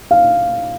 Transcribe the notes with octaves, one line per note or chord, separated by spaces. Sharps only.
F5